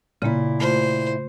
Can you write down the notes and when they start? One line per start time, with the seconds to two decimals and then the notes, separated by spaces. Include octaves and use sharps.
0.22 A#2 C#3 A#3 E4
0.60 A3 F4 C5